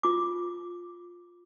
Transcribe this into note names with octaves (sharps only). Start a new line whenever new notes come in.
F4 D6